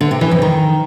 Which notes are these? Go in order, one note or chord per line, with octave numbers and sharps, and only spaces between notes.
D3
C3
E3
F2
D#3